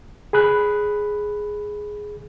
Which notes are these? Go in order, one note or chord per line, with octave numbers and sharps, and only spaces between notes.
G#4 B5 F#6